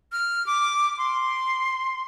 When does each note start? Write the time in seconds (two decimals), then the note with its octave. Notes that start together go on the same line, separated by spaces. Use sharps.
0.12 F6
0.46 D6
0.98 C6